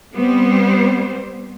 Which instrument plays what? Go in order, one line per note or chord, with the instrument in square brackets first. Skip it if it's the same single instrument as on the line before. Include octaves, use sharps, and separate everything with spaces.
[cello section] G3 B3 C4 C5